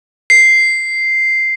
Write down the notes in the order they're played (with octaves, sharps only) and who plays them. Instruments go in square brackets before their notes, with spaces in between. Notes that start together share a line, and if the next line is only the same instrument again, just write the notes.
[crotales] C7